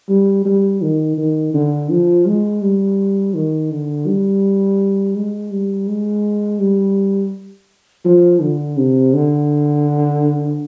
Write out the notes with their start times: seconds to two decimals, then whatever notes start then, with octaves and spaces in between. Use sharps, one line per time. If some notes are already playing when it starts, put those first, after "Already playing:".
0.09 G3
0.45 G3
0.82 D#3
1.18 D#3
1.54 D3
1.90 F3
2.26 G#3
2.63 G3
3.35 D#3
3.71 D3
4.07 G3
5.16 G#3
5.52 G3
5.88 G#3
6.61 G3
8.06 F3
8.42 D3
8.78 C3
9.14 D3